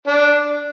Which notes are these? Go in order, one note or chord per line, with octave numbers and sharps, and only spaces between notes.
D4